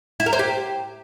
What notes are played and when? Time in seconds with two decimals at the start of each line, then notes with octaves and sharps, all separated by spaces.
0.20 E4
0.26 A#4
0.33 C5
0.39 G4